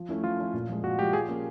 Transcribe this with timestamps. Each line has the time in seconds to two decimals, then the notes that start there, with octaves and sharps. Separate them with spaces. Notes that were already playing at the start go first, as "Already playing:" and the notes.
Already playing: F3
0.09 A3 C#4 E4
0.24 F3 F4
0.39 A3 C#4 E4
0.54 A#2
0.69 F3 G#3
0.83 A#2 F#4
0.99 G#3 G4
1.03 F3
1.13 F3 G#4
1.28 A#3 C#4